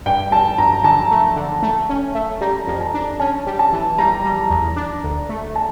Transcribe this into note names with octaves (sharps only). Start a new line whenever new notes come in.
G2 G5
G2 A5
G2 A#5
D3 A5
A3
D3
A3
C#4
A3
G3 A#5
F2
A5
D4
C#4 A5
G3
A5
E3
G3 A#5
G3
E2
D4
D2
A3
A5